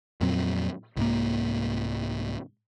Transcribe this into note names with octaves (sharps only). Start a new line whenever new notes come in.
F2 A#2 F#3 C4
C2 G#2 A#3